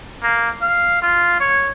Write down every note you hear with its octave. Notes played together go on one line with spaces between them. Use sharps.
A#3
F5
F4
C#5